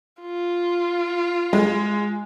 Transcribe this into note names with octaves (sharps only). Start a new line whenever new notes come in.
F4
G#3